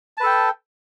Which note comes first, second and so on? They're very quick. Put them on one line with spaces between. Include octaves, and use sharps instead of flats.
A5 B4 A4 G5